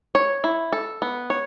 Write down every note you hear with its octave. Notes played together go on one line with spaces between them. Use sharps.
C#5
E4
A4
B3
C#5